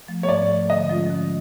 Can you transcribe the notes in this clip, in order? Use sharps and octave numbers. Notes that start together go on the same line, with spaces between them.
F3 A3
C#5
G#2 D5
F3 A3
D3 D#5
F3 G#3 C#4 F4
D3